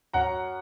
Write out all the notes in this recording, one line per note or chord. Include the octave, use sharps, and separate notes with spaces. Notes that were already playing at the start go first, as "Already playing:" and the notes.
F#2 F#3 C#4 F#5 A#5